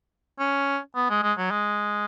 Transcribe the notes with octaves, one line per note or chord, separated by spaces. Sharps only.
C#4
B3
G#3
G#3
F#3
G#3